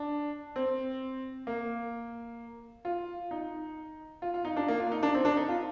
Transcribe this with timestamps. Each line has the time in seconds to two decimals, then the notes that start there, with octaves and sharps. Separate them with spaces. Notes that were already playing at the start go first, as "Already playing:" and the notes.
Already playing: D4
0.56 C4
1.47 A#3
2.85 F4
3.31 D#4
4.22 F4
4.34 F4
4.45 D#4
4.57 D4
4.68 A#3
4.79 F4
4.92 D#4
5.03 D4
5.14 C4
5.25 D4
5.37 D#4
5.49 F4